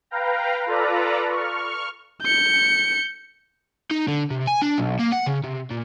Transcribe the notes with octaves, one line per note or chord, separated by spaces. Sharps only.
B4 F5 G5 A#5
F4 A4 B4 D5 A#5
C#6 F6
G6 C#7
D#4
D3
C3
G#5
D4
B1
A#3
F#5
C#3
C3
A#2